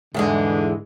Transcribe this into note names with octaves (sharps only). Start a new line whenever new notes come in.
E2 G#2 D3 E3 G#3